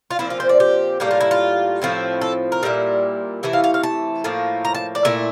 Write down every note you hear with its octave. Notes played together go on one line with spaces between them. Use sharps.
F4
A#2 F3 C4 E4
F4
C5
D5
G4
A2 G3 A#3 G4
F4
E4
F4
A2 F3 C4 E4
A4
A#4
A#2 G3 C4 E4
C3 E3 A3 E4 E5
F5
F5
F5
A5
A2 F3 A#3
A#5
A5
D5
A#2 A3 E4 E5